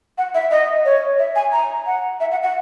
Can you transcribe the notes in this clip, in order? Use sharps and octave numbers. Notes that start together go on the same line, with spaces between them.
F#5
E5
D#5
C#5
E5
G#5
A#5
F#5
E5
F#5
F#5